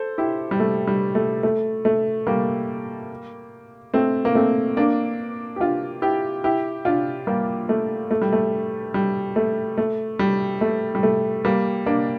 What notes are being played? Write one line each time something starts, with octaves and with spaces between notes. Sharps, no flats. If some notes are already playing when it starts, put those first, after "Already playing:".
Already playing: A4 C5
E4 G4
G3
A3
G3
A3
A3
A3
G3 A#3
A3 C4
A#3
A3 C4
A#3 D4
G4
D4 F4
E4 G4
E4 G4
D4 F4
G3 A#3
A3
A3
G3
A3
G3
A3
A3
G3
A3
G3
A3
G3 A#3
A#3 D4